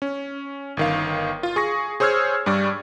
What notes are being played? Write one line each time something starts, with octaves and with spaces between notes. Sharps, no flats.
C#4
G1 D#3 F5
F4
G#4 C#6 A#6
G#4 C5 C#5 E6 F6 G#6
G2 G3 D5 C#6